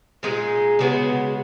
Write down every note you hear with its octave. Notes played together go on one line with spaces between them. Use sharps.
A#2 G#3 D#4 G#4
C#3 G#3 B3 F#4